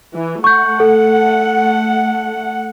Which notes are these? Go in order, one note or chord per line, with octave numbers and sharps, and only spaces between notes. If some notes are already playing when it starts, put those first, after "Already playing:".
E3
A3 F#5 C#6 G6
A4